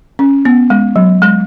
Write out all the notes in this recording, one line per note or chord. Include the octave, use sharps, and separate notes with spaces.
C#4
B3
G#3
F#3
G#3